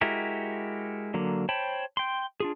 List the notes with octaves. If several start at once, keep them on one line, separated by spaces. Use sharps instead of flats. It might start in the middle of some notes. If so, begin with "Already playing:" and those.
G#3 E4 F#4 G4 A#4
D3 F#3 A#3
C5 C#5 G5 A5 B5
G5 C6
D4 F4 G#4